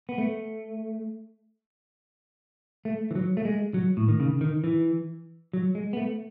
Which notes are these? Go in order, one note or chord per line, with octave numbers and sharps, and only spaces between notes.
B3
A3
A3
E3
F#3
A3
G#3
F#3
A2
D#3
C#3
D#3
E3
F#3
G#3
B3
A3